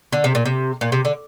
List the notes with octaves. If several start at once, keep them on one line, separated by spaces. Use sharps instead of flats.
D3
C3
A#2
C3
A#2
C3
D3